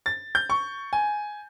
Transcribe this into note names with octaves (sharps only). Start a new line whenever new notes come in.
A6
G6
C#6
G#5